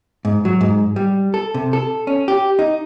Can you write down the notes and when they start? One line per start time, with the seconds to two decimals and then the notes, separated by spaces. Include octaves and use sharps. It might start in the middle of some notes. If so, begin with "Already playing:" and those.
0.25 G#2
0.45 F#3
0.61 G#2
0.96 G3
1.34 A4
1.54 C3
1.73 A4
2.07 C#4
2.28 G4
2.59 D#4